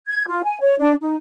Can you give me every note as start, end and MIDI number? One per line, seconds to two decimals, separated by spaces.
0.07 0.23 92
0.28 0.42 65
0.44 0.58 80
0.61 0.75 73
0.79 0.93 62
1.02 1.16 63